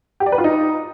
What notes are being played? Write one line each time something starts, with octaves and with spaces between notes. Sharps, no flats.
G4
D5
B4
F4
D#4